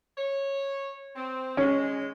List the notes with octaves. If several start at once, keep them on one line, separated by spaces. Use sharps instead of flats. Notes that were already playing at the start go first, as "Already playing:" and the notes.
C#5
C4
G#3 C#4